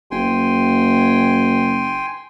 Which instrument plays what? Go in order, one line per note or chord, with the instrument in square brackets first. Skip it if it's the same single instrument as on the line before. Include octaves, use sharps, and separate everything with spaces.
[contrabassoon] F#1 [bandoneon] G5 G#5 C6